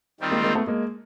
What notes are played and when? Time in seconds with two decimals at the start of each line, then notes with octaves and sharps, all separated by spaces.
0.20 D#3 G3 C4 F4
0.32 G#3 A#3
0.44 G#3 A#3
0.55 A3 B3
0.67 G#3 A#3